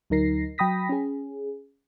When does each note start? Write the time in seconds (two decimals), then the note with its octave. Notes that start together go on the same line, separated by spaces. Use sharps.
0.10 D2 F#3 D#4 A#4 A#6 C7
0.58 F#3 G5 B5 D#6 A#6 B6
0.89 C#4 G#4